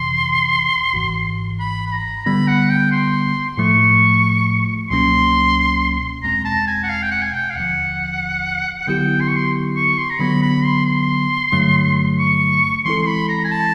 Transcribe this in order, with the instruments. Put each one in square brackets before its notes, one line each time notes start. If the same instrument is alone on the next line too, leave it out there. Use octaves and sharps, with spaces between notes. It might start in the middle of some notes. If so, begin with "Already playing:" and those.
Already playing: [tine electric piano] F2 C3 E3 [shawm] C6
[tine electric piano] G#1 G#2 E3
[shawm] B5
B5
A#5
[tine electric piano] D3 G3 B3 [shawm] B5
[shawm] F#5
G5
C6
[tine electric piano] A2 F3 A3 [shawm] C#6
[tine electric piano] C#2 B2 F#3 A#3 C#4 [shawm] C6
[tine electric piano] E2 B2 G#3 C4 [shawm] A#5
[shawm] A5
G#5
F#5
F5
G5
F#5
G#5
G5
F5
[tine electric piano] D#2 D3 F3 [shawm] F#5
[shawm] F#5
[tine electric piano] D3 F#3 B3 E4 G4 [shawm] G5
[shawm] C6
C#6
C6
C#6
C6
A#5
[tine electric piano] D3 F#3 B3 [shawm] B5
[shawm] B5
C6
C6
[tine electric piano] G2 D3 F#3 A3
[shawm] C#6
[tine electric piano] E3 G#3 C4 E4 A4 [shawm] C6
[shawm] C6
B5
A#5
G#5
A5